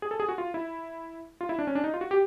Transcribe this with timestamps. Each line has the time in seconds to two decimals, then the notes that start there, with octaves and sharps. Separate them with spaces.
0.02 G#4
0.11 A4
0.20 G#4
0.29 F#4
0.38 F4
0.54 E4
1.41 F4
1.49 E4
1.59 D4
1.67 C#4
1.75 D4
1.84 D#4
1.94 F4
2.01 F#4
2.11 G4